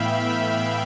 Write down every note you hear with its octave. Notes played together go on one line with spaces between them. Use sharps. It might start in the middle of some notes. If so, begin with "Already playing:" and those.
Already playing: A2 E3 B3 E5 F5 G5 B5
E5